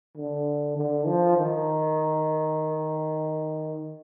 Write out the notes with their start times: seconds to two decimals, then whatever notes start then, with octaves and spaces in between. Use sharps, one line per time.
0.17 D3
0.76 D3
1.07 F3
1.37 D#3